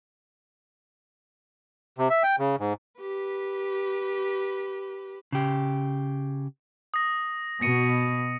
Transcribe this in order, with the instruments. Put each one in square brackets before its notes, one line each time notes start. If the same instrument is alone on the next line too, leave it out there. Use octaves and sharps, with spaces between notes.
[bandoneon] C3
E5
G5
C#3
G#2
[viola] G4 B4
[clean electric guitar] C#3 G4
[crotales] D#6 A#6
[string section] B2 [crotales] A#6 C#7 D#7